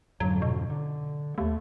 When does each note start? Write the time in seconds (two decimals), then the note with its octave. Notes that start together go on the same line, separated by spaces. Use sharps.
0.20 F2 G#2 D3 F#3
0.42 B2
0.70 D3
1.38 D#2 A3